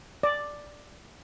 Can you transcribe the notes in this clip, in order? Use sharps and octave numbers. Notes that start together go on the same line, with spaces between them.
D5